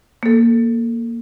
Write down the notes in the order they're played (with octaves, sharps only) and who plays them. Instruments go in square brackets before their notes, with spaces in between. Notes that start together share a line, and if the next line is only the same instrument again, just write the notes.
[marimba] A#3 A4